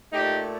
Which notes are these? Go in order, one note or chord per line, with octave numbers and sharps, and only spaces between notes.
A#2 A3 D#4 G4